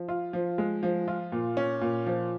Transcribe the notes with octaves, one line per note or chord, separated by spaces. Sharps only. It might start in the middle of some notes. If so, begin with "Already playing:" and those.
Already playing: F3
F4
F3
G#3
F3
F4
A#2
C#4
A#2
F3